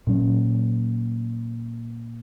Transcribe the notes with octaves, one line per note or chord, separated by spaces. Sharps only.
A#2 F#3 C#4